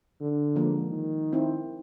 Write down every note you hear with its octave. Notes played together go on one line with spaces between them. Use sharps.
D3
F3 G#3 A#3
D#3
C4 D#4 E4